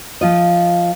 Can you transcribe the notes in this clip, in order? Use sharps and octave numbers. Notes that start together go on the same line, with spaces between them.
F3 F4 D#5